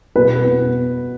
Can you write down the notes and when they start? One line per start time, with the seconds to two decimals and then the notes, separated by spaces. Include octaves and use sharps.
0.16 B2 B4
0.45 B3